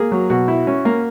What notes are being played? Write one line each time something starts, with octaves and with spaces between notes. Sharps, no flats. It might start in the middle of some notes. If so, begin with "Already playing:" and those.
Already playing: A#3 G#4
F#3
B2 F#4
E4
C#4
A#3